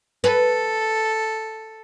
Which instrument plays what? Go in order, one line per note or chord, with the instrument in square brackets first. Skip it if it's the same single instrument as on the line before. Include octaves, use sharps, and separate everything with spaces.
[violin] A4 [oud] B4